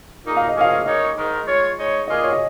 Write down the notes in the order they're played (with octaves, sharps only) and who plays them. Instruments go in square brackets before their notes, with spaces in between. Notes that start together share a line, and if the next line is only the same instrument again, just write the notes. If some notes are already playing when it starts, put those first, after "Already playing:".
[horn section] A#2 A#3 D#4 G#4
[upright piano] F5
D#5
[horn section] F3 A#3 C#4 G#4
[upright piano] F5
[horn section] C#3 A#3 D#4 C#5 [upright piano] D#5
[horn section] G#2 D#3 G#3 D#4 A#4
G#3 F4 C#5
G#3 D#4 C#5
[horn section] A#2 A#3 F4 G#4 [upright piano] D#5
[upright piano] C#5
D#5